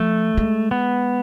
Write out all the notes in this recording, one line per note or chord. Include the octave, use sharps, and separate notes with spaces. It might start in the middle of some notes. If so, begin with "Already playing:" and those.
Already playing: F3 A3
G#3
B3